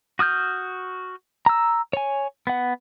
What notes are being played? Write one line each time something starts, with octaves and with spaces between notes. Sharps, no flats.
F#4 D#6 F6 G6
A#5 E6
C#5 G#5
B3 F#5